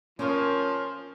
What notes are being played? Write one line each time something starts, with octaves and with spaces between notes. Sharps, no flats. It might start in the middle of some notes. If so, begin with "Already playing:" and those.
F3 C#4 F4 A#4 C#5